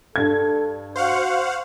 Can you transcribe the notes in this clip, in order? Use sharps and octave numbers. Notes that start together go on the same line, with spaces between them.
G2 A4 G#6
F#4 C5 F5 F#5 C#6